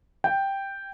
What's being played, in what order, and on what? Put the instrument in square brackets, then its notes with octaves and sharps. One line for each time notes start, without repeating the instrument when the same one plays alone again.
[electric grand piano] G5